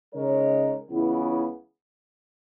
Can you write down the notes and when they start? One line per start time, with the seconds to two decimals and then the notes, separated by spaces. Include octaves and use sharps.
0.13 C#3 G#3 D#4 A#4 C#5
0.88 C#2 C#3 E3 B3 E4